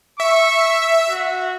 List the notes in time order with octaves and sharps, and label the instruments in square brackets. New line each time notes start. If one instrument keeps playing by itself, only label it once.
[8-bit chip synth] E5 [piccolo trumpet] C#6
[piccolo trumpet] F#4